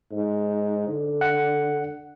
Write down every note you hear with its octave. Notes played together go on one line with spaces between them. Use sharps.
G#2
D3
F#5